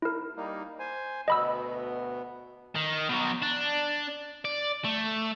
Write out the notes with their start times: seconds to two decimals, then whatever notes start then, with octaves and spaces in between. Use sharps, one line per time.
0.02 E4 A#4
0.36 G3 A#3 D#4
0.79 C5 G#5
1.28 D2 B2 B3 D#5 B5 E6
2.75 D#3
3.09 B2 F#3
3.42 D4
4.45 D5
4.84 A3